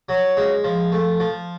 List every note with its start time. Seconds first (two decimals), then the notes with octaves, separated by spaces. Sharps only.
0.09 F#3
0.37 G#3
0.64 F3
0.92 A3
1.20 F3